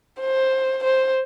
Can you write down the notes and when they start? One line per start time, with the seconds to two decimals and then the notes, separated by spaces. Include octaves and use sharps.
0.21 C5
0.84 C5